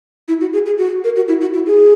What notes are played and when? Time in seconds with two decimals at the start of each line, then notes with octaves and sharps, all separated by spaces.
0.28 E4
0.41 F#4
0.53 G#4
0.66 G#4
0.78 F#4
1.04 A#4
1.16 F#4
1.28 E4
1.41 F#4
1.54 E4
1.67 G#4